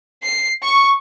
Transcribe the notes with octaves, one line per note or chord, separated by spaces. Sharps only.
C7
C#6